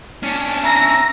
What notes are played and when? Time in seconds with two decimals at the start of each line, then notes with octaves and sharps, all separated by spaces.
0.23 C#4 D4
0.65 E5 A#5 A#6